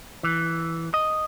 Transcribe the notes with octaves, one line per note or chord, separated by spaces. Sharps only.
E3
D#5